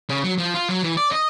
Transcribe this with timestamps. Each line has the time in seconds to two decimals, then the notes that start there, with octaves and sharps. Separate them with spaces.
0.09 C#3
0.24 F#3
0.38 F3
0.54 F4
0.69 F#3
0.83 E3
0.97 D5
1.12 D#5